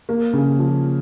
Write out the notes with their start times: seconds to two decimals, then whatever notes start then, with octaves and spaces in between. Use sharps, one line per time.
0.09 A#3
0.33 C#3
0.59 F3